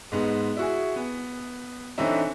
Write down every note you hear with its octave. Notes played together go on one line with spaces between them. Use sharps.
G#2 G#3 B3
E4 F#4 G#4
B3
D3 E3 C4 C#4 D#4 E4